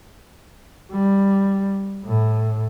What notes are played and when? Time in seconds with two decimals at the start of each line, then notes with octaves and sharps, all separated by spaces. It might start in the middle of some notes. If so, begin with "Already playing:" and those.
0.92 G3
2.06 A2